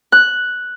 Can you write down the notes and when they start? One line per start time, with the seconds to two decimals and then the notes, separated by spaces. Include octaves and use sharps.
0.12 F#6